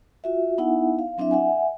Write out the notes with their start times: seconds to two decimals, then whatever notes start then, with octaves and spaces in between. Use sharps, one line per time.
0.24 F4 F#4 E5
0.58 B3 D#4 E4 E5 F#5 G#5
0.99 F5
1.18 F#3 C4 D4 E4 E5
1.31 E5 F#5 G#5